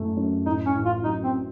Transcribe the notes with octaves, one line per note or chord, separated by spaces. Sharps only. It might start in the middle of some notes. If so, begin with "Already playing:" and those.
Already playing: F#2 A3
F#2
A2 D#4
C#4
A1
F4
F#3 D#4
C4